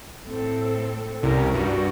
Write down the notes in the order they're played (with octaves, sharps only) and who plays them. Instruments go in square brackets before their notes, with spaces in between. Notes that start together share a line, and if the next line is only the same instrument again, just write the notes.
[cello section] A2 C4 A4
[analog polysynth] C2 [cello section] C#4 G4 A#4
[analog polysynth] G2 [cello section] F#4